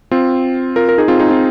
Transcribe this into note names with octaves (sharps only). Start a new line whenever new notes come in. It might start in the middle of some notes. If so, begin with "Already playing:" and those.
C4 F4
F4 A#4
A#4
D#4 G#4
C4 F4
D#4 G#4
C4 F4